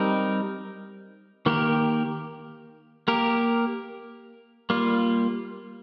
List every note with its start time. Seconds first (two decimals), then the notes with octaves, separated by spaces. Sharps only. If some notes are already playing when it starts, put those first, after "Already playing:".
Already playing: G3 C4 D#4 A#4
1.46 D#3 A#3 G4 A#4
3.08 A#3 G4 A#4
4.70 G3 A#3 F4